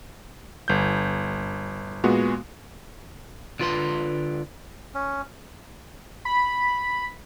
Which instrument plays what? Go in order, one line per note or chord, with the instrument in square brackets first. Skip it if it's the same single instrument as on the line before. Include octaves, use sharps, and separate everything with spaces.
[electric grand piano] G1 G6
A#2 G#3 B3 F#4
[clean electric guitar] D3 F4 B4 C6
[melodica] C#4
[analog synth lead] B5